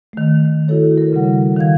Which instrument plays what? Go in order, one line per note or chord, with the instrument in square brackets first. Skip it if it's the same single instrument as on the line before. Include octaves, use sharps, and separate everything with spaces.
[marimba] D#3 A3
E4 F#4 A4 C#5
A#4
C#3 G3 F#5
D#3 F5 G#6